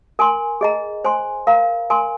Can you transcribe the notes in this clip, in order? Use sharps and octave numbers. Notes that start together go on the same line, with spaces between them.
A#4 G#5 C6
G#4 D#5 A#5
C5 G#5 C6
A#4 F5 A#5
A#4 G#5 C6